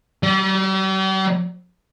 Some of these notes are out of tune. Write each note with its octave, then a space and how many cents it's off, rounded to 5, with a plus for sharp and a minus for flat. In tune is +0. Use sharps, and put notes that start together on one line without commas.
G3 -45